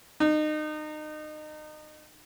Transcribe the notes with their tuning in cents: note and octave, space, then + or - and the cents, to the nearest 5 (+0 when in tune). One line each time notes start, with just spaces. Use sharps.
D#4 -30